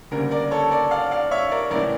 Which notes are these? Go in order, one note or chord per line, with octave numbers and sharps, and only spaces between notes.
D2 C#3 G3 A#3 A#4
A#4 D5
A4 C#5
A#4 D5
D5 F5
D5 F5
C#5 E5
A#4 D5
A1 A2 E3 A#4 D5